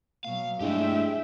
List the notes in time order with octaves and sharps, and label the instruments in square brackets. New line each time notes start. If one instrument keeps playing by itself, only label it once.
[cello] B2 F#3 [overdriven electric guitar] F5
[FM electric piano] G2 D4 E4 [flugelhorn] G#3 [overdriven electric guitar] A3 G4 [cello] E5 G5